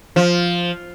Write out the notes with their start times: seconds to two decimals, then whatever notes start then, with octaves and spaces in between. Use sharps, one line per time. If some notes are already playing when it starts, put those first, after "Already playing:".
0.16 F3